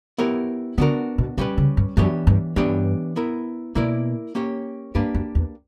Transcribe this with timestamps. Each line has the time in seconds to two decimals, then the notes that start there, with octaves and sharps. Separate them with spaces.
0.18 B3 E4 G4 A#4 C#5
0.78 D3 B3 D4 F#4 A#4
1.18 B2
1.38 B2 G3 C#4 G4 B4
1.58 C#3
1.77 G2
1.97 F#2 E3 B3 D4 G4 C#5
2.27 G2
2.56 G2 E3 B3 D4 G4 C#5
3.16 B3 E4 A#4
3.75 B2 A#3 E4 A#4 D5
4.35 A#3 C#4 G4 C#5
4.95 G2 A#3 D4 G4 B4
5.15 F#2
5.35 E2